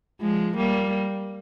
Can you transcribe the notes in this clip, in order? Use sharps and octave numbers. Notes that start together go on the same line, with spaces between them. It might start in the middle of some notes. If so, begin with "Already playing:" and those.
F3 G#3
G3 A#3